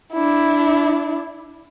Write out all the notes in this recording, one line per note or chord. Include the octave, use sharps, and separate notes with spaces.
D4 E4